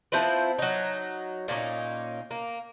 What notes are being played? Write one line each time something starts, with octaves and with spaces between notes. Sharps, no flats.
F3 C4 E4 B4
F#3 D#4
A#2 A#3 C#4 D#4
A#3